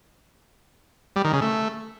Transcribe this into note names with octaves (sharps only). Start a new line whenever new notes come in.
G3
D#3
C#3
A3